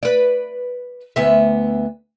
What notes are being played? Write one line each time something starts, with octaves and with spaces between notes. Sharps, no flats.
B4 D5
D2 B3 E5